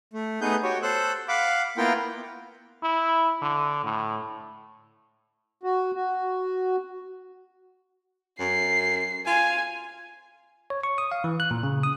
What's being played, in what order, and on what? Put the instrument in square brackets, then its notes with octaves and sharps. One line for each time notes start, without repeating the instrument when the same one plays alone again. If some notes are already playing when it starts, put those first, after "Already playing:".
[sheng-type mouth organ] A3
A3 B3 D#4 G#4 B4 G6
F#4 G4 C#5
A4 C5 E6 F#6
F5 F#5 B5 D6
A#3 B3 E4 F4 A#4 G5
[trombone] E4
D3
A2
[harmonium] F#4
F#4
[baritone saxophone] F#2 [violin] C7
[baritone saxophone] F4 [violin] G#5
[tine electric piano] C#5
C#6
D#6
F5
E3
F#6
A#2
C#3
D#6